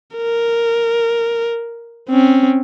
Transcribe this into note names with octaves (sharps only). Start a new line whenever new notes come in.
A#4
C4 C#4